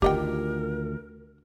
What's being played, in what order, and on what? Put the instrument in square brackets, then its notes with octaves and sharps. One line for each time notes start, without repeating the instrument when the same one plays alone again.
[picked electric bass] D2 [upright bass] D#3 F4 [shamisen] G4 D#5 G5 [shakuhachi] A#4